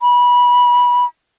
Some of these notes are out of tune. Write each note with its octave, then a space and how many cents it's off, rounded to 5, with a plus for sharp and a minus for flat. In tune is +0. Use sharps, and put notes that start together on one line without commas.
B5 -20